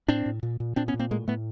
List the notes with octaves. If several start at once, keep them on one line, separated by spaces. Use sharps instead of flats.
A2 C4 D4
A2
A#2
A#2
A#2 C4 D4
B3 C#4
A#2
A#3 C4
A2 G#3 A#3
A2 A3 B3